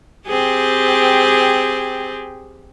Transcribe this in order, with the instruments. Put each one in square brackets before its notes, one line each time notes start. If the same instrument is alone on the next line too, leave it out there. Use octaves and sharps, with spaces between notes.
[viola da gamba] C4 G4 G#4